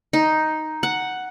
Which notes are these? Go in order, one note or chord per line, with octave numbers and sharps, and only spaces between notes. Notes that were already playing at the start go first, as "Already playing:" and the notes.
D#4
F#5